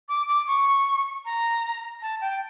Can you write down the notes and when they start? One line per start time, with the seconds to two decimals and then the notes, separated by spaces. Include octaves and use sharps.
0.09 D6
0.28 D6
0.47 C#6
1.25 A#5
2.02 A5
2.21 G5